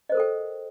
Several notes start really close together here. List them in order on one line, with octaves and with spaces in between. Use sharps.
D#5 C5 A#4 A4 G5